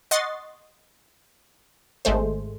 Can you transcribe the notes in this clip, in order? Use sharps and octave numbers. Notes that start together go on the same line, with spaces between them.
D#5 F#5 C6 C#6 A6 C7
G#1 G#3 A3 C5